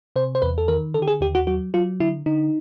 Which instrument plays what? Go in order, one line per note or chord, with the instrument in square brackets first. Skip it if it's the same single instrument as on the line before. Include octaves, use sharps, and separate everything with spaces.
[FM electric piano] C3 C5
C5
E2 B4
A4
D#3 A#4
D3 A4
G4
G#4
D#2 G4
F#4
F#3 F#4
F#3 F4
D3 E4
D3 D#4